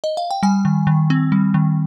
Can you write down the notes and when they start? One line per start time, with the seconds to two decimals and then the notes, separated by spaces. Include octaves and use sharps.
0.04 D#5
0.17 F5
0.31 G5
0.43 G3 G#5
0.65 D#3
0.87 D#3
1.10 C4
1.32 G3
1.54 D#3